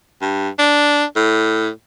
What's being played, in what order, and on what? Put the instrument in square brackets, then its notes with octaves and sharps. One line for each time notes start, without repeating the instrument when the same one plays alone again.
[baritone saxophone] G2
D4
A2